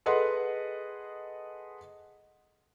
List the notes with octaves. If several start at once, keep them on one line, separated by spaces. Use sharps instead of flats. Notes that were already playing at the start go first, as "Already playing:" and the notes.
G#4 A4 B4 D#5 F#5 C6